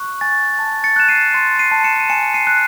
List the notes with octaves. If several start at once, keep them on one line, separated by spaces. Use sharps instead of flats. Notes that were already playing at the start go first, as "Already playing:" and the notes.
Already playing: C#6 F#6
G#5 A6
A5
A6 C#7
F#6 E7
C7 D#7
C6 A6 C#7
C7 D#7
A5
C#7 E7
D#7
G#5 C#7 E7
C7 D#7
F#6